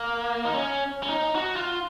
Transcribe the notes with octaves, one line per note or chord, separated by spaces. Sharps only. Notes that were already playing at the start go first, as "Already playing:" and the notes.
Already playing: A#3
D#4
C#4
C#4
D#4
F#4
F4